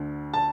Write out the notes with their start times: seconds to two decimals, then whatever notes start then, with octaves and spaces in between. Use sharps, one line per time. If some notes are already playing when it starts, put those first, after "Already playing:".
Already playing: D2 D3
0.34 A5